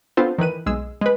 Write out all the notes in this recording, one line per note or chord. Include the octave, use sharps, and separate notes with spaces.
B3 C4 D4 F4 A4 C5
D#3 E3 B4 D#7
B1 G#3 E6
G#3 B4